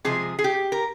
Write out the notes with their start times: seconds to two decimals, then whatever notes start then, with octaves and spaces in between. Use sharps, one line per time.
0.04 C3 F3 G#3 G#4
0.39 G#4
0.44 G4
0.72 A#4